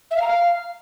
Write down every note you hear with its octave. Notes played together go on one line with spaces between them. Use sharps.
E5
F5
A#5
F5